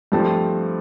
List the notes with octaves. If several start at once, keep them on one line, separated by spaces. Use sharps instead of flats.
G2 F3 A3 C4 A5